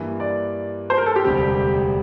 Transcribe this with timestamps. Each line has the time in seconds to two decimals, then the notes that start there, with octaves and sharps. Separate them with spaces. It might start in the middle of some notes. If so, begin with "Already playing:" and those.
Already playing: G2 E3 A#3
0.20 D5
0.90 C5
0.98 A#4
1.06 A4
1.16 G4
1.24 E1 D2 C3 G3 C4